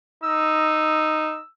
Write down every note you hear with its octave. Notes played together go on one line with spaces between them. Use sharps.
D#4 E6